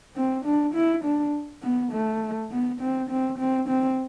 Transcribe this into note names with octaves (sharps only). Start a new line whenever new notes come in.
C4
D4
E4
D4
B3
A3
B3
C4
C4
C4
C4